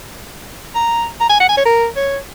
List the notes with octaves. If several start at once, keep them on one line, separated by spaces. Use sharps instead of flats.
A#5
A#5
G#5
F#5
G#5
C#5
A#4
C#5